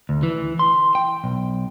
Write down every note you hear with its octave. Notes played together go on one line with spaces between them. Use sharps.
D2
E3
C6
G5
B1